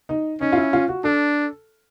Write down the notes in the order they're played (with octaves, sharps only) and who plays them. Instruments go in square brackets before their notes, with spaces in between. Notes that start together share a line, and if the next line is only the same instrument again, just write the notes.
[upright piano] D#4
[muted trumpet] C#4 [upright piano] D#4
[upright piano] F4
E4
F4
F#4
[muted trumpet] D4 [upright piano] A4